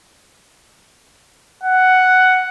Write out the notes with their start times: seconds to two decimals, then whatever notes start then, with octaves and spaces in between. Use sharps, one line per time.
1.64 F#5